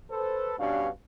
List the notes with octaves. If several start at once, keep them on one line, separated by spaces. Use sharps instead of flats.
A4 B4 C5
G2 B2 C#4 D4 G4 F5